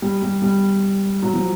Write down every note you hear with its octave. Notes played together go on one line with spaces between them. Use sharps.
G3
G3
G3
F#3
F3